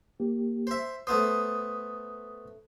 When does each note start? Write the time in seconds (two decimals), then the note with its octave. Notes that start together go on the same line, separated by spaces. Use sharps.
0.20 A#3 G4
0.67 C5 E5
1.07 A3 B3 C5 D#6